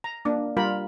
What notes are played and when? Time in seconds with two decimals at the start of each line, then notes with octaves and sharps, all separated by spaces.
0.04 A#5
0.25 A#3 D4
0.57 G3 F4 A#4 B5